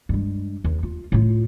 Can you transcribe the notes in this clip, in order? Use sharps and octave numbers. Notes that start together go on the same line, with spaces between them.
G2 G#3
D#2
F4
A2 F4